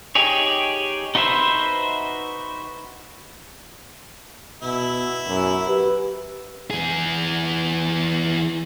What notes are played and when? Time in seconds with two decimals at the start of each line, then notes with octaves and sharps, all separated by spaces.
0.15 D#4 G4 G#4 C#5
1.15 D#4 F#4 B4 C5 E5
4.62 B2 E4
5.27 F#2
5.68 G4 B4
6.71 E3 G#4